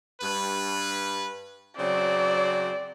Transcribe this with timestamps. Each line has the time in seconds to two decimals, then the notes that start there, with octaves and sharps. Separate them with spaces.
0.22 G2 B4
1.78 C#3 F#3 C4 D5